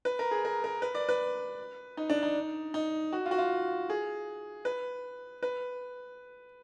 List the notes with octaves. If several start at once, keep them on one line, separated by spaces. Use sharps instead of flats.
B4
A#4
G#4
A#4
A#4
B4
D5
B4
D#4
D4
D#4
D#4
F#4
F4
F#4
F4
G#4
B4
B4